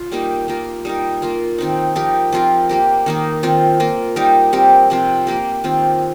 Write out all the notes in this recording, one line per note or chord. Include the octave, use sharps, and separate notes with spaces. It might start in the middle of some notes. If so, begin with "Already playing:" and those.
Already playing: F4
G3 A#3 D#4 G4
A#3 F4 A#4
G3 D#4 A#4
A#3 F4 A#4
D#3 C4 D#4
F3 D#4 G4 A#4
F3 C4 F4 A#4
A#3 G4 A#4
D#3 A#3 D#4
D#3 C4 F4
A#3 F4 A#4
G3 D#4 G4 A#4
G3 C4 G4 A#4
C3 F3 C4 F4
A#3 G4 A#4
D#3 C4 F4